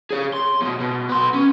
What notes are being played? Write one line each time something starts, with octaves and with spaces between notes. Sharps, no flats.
G#4 C#5
C6
E2 B2
B2
B3 C6
C#4